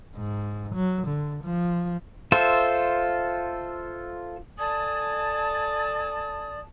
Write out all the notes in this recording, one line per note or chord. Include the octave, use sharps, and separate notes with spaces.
G#2
F#3
D3
F3
F4 A4 C5 E5
A4 D5 G#5 A5 D#6